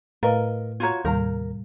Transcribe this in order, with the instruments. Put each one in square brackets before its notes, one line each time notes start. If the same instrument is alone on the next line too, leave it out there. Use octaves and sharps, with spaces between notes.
[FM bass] A2 [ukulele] A#4 D#5 [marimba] B4 F5 A#5
[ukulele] F4 F#4 C#5 [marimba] A#5 G#6
[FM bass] D#2 [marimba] A2 C3 G3 [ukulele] A#4